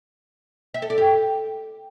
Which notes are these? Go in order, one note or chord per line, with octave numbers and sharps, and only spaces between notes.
E5
A4
D5
G4